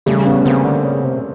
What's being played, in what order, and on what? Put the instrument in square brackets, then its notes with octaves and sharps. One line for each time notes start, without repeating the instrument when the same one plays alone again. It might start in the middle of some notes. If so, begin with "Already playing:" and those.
[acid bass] C#3 [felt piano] G3 A3
[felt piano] B3 C#4
[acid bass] C#3 [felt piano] A#3 C4
[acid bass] D3
C#3
C3